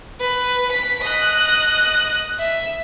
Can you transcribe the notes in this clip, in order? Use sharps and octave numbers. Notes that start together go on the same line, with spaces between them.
B4
B6
D#5 F#6
E5